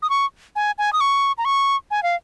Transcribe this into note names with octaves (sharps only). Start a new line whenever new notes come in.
D#6
C#6
G#5
G#5
D#6
C#6
A#5
C#6
G#5
F5